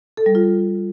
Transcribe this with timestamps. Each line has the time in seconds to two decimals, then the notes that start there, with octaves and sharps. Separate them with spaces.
0.17 A4
0.26 G3
0.35 F4